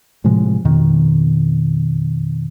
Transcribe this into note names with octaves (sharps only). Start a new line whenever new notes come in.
A2 C3 F3 G#3
F2 B2 D#3